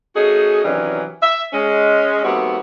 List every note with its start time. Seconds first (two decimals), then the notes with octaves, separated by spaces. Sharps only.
0.16 A3 C#4 D#4 F#4 G#4
0.64 C3 D#3 E3 F#3 C#4 D4
1.23 E5
1.53 G#3 C#4
2.24 D#2 G3 A3 B3 C4 F#4